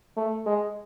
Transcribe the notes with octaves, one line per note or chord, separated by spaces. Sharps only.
A3
G#3